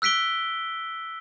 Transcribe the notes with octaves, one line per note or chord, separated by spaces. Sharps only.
E6 F#6 B6 D7 G7